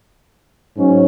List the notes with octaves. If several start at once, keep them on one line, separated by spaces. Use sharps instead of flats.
G#2 F#3 C#4